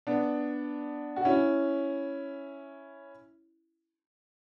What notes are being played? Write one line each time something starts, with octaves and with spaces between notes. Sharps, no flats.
B3 D4
F#4
C#4 E4